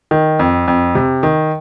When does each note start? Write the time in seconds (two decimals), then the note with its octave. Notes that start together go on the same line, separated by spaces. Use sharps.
0.11 D#3
0.39 F2
0.68 F2
0.95 C3
1.23 D#3